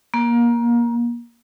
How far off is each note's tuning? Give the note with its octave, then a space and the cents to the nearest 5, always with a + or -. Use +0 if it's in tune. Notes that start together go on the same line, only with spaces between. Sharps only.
A#3 +25